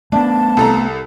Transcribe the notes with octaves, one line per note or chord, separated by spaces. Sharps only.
A3 B3 D4 A5
C2 A4 A#5